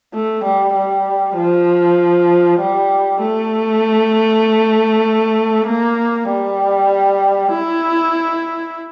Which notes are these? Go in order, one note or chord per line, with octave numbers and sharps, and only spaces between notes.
A3
G3
G3
F3
G3
A3
A#3
G3
E4